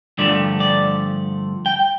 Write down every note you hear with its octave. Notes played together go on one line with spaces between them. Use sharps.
G2 D3 F3 A3 D5
D5
G5